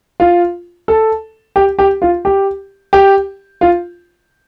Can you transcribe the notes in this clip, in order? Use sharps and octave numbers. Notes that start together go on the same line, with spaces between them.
F4
A4
G4
G4
F4
G4
G4
F4